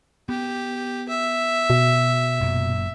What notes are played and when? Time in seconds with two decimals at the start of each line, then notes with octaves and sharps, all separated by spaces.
0.29 B3 G4
1.08 E5
1.70 B2
2.41 F#1 F#2 A#2